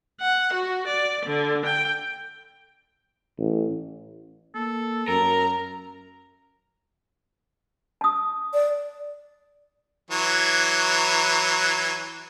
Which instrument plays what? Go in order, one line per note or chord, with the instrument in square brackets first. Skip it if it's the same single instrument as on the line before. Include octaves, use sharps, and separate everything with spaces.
[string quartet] F#5
F#4
D5
D3
G5
[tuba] A1
[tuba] A#3 [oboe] A4
[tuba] F#2 [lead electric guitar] A#4 [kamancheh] A#5
[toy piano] A5 D#6
[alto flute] D5
[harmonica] E3 F#3